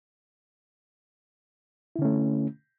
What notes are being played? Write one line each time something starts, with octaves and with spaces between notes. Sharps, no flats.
D3 A3 C#4 E4